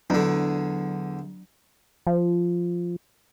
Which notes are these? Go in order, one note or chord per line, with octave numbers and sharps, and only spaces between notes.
E2 D3 F#3 D4
F3